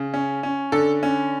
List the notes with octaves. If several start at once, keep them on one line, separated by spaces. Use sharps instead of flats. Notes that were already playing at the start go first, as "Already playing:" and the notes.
Already playing: C#3
C#4
C#4
D3 A4
C#4